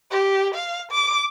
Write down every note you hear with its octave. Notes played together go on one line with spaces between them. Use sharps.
G4
F5
D6